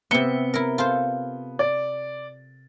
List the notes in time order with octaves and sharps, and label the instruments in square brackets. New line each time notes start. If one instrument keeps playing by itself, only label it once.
[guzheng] C3 E5 [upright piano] B3 C#7 G7
[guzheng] E4 A#4
F4 A4 C5
[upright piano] D5